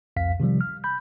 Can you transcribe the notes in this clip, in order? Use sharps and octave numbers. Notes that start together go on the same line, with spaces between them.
C2 F2 F5 B6
C3 D#3 F3 G3
F6
B5 G6